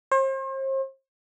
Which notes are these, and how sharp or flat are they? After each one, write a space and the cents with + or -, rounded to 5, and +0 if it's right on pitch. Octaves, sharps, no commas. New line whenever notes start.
C5 +40